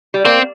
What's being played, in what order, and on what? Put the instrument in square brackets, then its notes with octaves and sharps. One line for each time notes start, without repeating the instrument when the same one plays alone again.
[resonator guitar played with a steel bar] G3
[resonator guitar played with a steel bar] A#3 [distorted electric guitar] C4